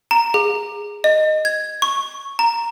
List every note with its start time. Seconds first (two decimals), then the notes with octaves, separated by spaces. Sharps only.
0.11 A#5
0.34 G#4
1.04 D#5
1.45 G#6
1.82 C#6
2.39 A#5